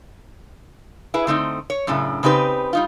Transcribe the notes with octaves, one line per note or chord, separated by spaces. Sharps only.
E4 G#4 B4
D3 A3 C4 D#4
C#5
F#2 A2 C#3 D4
C#3 C4 D#4 G4 B4
G3 D#4 F4